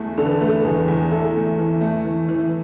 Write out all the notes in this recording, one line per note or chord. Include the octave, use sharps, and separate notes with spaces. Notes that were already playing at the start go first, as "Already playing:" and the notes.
Already playing: E2 A3
D3 A4
B4
A4
A3 B4
A4
E2 G#4
E2
E4 A4
A3
E3
A3
E3
E3